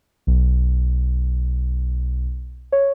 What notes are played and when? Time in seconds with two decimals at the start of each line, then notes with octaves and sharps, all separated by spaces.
0.27 B1
2.72 C#5